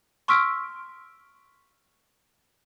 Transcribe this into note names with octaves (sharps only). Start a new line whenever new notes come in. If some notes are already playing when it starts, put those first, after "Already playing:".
C6 C#6 E6 F6 B6 D7